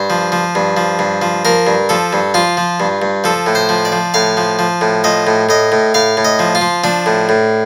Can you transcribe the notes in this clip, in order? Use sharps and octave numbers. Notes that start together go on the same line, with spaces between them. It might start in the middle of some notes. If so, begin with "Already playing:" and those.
Already playing: G2 C5
F3
F3
G2
F3
G2
F3
F3 A#4
G2
F3 A4
G2
F3 F4
F3
G2
G2
F3 A4
A2
C5
F3
D5
F3
A2 F5
F3
F3
A2
F3 D#5
A2
A2 D#5
A2
A2 F5
A2
D#5
F3
F4
F3
F3 D4
A2
A2